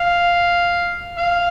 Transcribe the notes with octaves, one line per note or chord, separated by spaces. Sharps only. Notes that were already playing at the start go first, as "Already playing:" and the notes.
Already playing: F5
F5